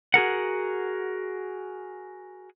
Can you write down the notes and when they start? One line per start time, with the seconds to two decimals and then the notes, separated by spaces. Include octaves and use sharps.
0.14 F#4 G#4 A#4 F#5